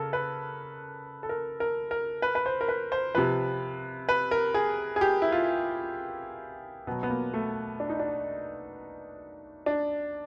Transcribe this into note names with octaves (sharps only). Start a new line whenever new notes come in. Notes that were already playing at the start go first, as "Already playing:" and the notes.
Already playing: C#3 A4 A#4
B4
A4
A#4
A#4
A#4
B4
B4
C5
A#4
B4
C5
C3 F3 B4
B4
A#4
G#4
G#4
G4
E4
F4
B2 F#3 B3
B3
A#3
A3
D4
D#4
D4
D4